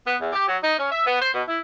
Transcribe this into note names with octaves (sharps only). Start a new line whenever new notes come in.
B3
E2
G4
F#3
D#4
C#4
E5
B3
C5
B2
E4